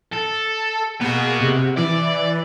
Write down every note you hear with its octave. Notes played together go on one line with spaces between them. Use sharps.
A4
A#3 B3 F#4 G#4
C3
E3 D5